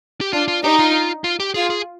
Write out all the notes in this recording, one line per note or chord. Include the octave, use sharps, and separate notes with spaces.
G4
D4 F4
F4
D#4 G4
F4
F4
G4
F4 G#4
G#4